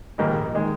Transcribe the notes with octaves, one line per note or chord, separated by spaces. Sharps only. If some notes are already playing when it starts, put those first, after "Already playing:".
A#1 G#2 D#3 G3 A#3
D#3 G#3